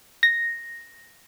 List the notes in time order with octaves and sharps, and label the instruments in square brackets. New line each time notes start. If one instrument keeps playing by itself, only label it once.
[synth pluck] A#6